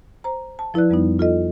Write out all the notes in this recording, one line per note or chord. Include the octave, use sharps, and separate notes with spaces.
C5 A#5
A5
F3 E4 B4 D5 F#6
F2 G3 B3 D#4
F4 A4 D#5